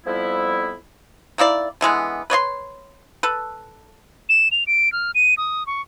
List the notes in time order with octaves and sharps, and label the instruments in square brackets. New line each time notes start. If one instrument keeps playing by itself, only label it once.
[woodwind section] F2 F3 G3 B3 E4
[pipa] D#3 A#3 E4 D5
D3 E3 G#3 B3
B4 C#5 D5 C6
A4 B4
[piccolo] E7
F7
D7
F6
D#7
D#6
C#6